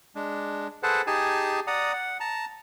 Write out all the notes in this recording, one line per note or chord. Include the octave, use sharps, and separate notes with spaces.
G#3 D4
G#4 A4 B4 C5 F#5 A5
D#4 G4 G#4 G#5 A5
D5 F#5 A#5 D#6
F#5
A5 A#5